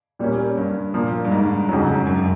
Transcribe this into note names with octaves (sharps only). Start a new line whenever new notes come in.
A#2 G3 A#3 C#4
G2
A#2 F3 A#3
G2
G#2
F2 G#2 C#3 F#3
F#2